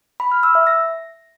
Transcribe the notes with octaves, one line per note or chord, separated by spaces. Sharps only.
B5
F6
E6
E5
A#6